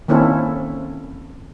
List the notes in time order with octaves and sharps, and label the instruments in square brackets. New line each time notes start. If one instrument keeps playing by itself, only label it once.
[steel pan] D#3 A#3 C4 C#4 E4 A4